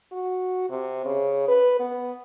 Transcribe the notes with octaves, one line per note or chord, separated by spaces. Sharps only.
F#4
C3
C#3
B4
B3